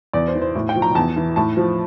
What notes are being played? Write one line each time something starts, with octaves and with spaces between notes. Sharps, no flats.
E2 D5
C5
E3
C5
A2
G5
F3
A#5
E2 A5
E3
A2 A5
F3